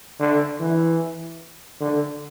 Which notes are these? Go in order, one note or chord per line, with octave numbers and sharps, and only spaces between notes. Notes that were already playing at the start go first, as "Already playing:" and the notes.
D3
E3
D3